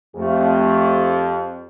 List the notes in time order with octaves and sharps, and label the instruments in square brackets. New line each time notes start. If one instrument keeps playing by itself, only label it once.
[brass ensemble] F2 [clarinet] A3 [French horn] G4